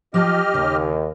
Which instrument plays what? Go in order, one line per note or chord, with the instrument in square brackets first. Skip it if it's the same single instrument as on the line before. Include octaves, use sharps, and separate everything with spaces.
[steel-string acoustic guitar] F3 F4 A5 [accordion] G4 D#5 F6
[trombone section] D#2 [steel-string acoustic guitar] C#3